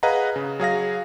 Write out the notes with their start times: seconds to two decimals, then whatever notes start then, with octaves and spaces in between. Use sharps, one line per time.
0.03 G#4 B4 D#5 F5 F#5 A#5
0.36 C#3
0.60 F#3 G#4 F5 A#6